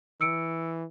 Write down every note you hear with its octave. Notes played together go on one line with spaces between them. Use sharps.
E3 E6 C#7 D7